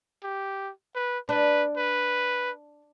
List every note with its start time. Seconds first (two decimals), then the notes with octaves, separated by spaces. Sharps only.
0.23 G4
0.95 B4
1.29 D4 B4
1.77 B4